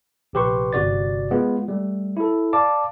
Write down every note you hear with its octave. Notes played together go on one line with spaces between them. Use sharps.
A#1 C3 G4 B4 C6 C#6
G1 C3 F#4 D5 A6
G#3 B3 F4
G3 A3
E4 A4
D5 F5 A5 D6